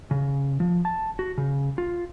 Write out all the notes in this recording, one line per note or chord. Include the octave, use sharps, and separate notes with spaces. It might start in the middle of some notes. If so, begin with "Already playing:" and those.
C#3
F3
A5
F#4
C#3
F4